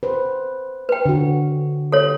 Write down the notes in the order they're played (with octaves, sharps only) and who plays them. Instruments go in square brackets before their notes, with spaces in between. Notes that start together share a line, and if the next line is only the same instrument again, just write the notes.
[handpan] B4 C5
[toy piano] B4 G5
[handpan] D3 F#4
[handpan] G4 [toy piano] A4 C#5